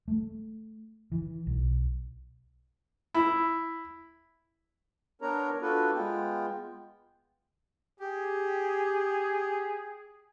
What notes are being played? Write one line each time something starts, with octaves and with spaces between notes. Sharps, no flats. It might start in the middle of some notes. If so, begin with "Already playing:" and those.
A3
E3
B1
E4
B3 D4 A#4 C#5 A#5
D4 F4 F#4 A4 B4
G#3 B3 F4 G5
G4 G#4